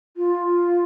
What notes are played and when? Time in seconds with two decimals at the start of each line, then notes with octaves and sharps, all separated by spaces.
0.17 F4